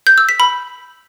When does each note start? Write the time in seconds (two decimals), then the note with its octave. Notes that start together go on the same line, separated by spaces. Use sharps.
0.07 G6
0.18 E6
0.29 B6
0.40 B5